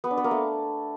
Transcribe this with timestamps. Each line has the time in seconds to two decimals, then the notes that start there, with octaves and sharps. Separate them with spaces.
0.04 B3
0.11 D4
0.17 B3
0.24 A#3
0.31 A3